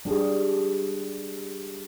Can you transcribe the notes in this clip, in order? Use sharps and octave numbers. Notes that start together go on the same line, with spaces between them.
G3 D4 G4 G#4